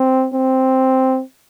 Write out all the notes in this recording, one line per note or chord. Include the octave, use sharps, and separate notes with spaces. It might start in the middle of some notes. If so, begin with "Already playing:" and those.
Already playing: C4
C4